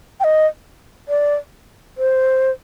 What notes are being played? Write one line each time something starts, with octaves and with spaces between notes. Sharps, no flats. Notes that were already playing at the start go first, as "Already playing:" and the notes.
G5
D#5
D5
C5